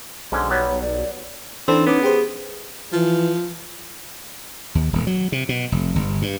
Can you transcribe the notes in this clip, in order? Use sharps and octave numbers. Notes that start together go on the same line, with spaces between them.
B1 G#2 D3 C#4 C6
F#3 G3 B3 C#5
D5
E3 C4 D4 D#4 A4
B3 C#4 D6
G4 G#4 C5
E3 F3
D#2
D#1
F#3
C3
B2
F1
G1
G2